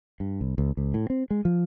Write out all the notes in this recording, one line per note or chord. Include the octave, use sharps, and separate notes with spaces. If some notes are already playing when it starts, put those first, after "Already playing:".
G2
C2
C#2
C#2
A2
C4
G#3
F3